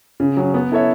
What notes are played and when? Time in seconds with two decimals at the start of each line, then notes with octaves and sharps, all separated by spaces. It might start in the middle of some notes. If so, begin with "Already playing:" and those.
0.20 C#3
0.37 F#3 C#4
0.54 B3
0.71 E4 A4 C#5 E5